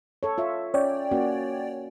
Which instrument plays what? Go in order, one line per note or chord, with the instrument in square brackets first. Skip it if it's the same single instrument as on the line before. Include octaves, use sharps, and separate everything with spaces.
[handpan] A4 C#5
F4 C#5 E5
[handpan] C#4 [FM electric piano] C#5 D5 G5
[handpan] A#3 C#4 F#4